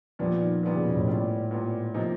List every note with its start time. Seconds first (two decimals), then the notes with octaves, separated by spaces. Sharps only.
0.19 A#2 F3 G3 B3 D4
0.41 D#3
0.63 A#2 G3 B3 D4
0.74 C#3
0.85 B2
0.96 A2
1.07 A#2 G3 B3 D4
1.51 A#2 G3 B3 D4
1.94 C3 F3 A#3 D#4